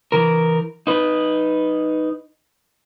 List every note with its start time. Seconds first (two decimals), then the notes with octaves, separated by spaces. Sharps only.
0.12 E3 A#4
0.87 D#4 B4